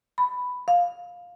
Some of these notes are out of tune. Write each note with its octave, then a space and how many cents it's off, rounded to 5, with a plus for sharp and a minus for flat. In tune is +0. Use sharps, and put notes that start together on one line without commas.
B5 +5
F5 +15